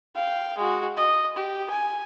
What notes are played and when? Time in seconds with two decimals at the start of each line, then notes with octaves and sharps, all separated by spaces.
0.15 F5 G5
0.58 G#3 F#4
0.97 D#5
1.36 G4
1.70 G#5